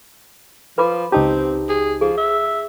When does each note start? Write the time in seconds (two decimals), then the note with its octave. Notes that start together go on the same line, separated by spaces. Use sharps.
0.78 F3 B4 B5 D6
1.12 C#2 C4 D#4 G4 A5
1.69 G#4
2.01 F3 G#4
2.18 E5